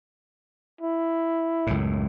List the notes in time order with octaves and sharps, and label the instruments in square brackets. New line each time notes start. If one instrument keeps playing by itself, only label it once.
[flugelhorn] E4
[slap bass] C#2 F#2 A2